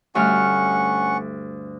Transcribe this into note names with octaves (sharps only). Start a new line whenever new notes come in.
D2 G2 C#4 F#5 C#6 F6